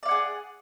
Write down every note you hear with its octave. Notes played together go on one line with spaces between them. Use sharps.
G#4 D5 F5 F#5